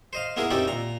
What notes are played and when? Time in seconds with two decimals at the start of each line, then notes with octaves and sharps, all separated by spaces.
0.13 C5 D#5 F5
0.36 A#3 B3 E4 G#4 A#4
0.50 C4 C#4 D#4 E4 G4 D5
0.67 A#2 A#5